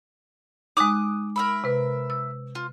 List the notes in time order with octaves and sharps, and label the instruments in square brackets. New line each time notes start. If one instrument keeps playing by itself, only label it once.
[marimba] G#3 D#4 [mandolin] D6 D#6 F#6
[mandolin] A#4 E5 B5
[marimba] C3 B4
E6
[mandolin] F4